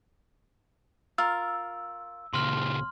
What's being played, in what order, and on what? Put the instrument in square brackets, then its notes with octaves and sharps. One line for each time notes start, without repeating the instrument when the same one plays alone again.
[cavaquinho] F4 A#4 [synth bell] E6
[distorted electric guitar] C#2 A#2 [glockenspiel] C6 F6